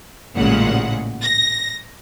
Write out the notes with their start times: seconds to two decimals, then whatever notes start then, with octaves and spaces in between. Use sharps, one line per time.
0.36 A1 A#2 C#3 G#3 F#5
1.22 A#6